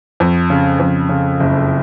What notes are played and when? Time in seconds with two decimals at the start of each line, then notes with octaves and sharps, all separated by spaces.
0.20 F2
0.50 C#3
0.79 F2
1.09 C#3
1.40 F#1